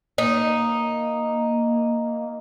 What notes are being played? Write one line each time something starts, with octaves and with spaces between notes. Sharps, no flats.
A#3 D#4